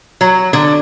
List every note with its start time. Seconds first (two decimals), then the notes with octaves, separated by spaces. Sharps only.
0.21 F#3
0.53 D3